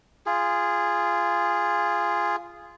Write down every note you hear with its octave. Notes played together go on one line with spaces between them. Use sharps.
F4 G#4